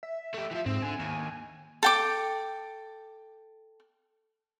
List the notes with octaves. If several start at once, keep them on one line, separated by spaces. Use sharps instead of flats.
E5
A3 G4
E3 F3
G#2 C4
D3 G#5
D#2
A4 G5 D6